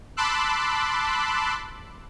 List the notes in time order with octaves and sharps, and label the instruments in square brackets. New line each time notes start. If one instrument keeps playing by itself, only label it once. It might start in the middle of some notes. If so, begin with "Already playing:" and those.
[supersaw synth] A5 B5 C6 D6 E6 F#6